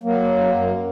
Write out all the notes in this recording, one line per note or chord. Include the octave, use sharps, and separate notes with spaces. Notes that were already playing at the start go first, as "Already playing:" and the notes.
F#3 A#3
F#2
F#2